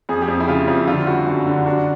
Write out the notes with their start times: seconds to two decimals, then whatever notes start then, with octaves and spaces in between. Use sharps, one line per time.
0.09 F2 G#4
0.22 G4
0.28 F2
0.40 E4
0.48 C#3 F4
0.68 F2
0.87 D3 F4
1.07 G3 F#4
1.27 F#2 F#4
1.47 D3
1.66 D4 F#4